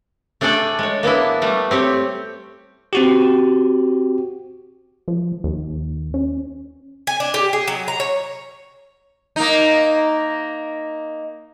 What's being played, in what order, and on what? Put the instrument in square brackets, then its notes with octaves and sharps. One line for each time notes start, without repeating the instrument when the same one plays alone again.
[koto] A3 D4 G#4 A4 D5 G5
G#3 C#5
A#3 B3 D4 E4
G3 A3
C4 G4 C#5
[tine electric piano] C4 F#4 G4
[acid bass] F3
D#2
C#4
[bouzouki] G#5
D4
G4
G#4
F#3
A#5
C#5
[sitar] A#3 D#4